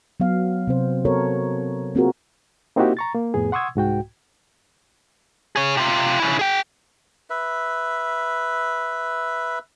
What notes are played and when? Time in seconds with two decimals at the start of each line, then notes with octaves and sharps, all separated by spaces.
0.20 F#3 B3 F5
0.67 C3 C4 C5
1.05 B3 F#4 A4 A#4 C#5
1.95 A#3 C4 F4 F#4 G#4 A#4
2.76 A#3 C4 D#4 E4 F#4 G4
2.97 A#5 C#6 A6
3.14 A#3
3.34 F2 A2 B3 G#4
3.52 F#5 C6 C#6 D#6 E6 G#6
3.75 C2 G#2 F#4 G5
5.56 G#4 C#5
5.77 C3 F4
6.20 C#3 E4
6.39 G#4 G5
7.30 B4 E5